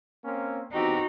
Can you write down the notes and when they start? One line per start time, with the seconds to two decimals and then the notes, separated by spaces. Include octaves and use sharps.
0.25 A#3 C4 C#4
0.72 E2 C4 D#4 F#4 G4